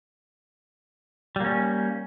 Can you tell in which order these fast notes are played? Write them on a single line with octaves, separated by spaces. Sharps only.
G3 A#3 C#4